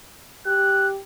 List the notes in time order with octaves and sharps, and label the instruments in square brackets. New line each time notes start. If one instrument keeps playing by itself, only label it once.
[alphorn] G4 [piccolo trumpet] F#6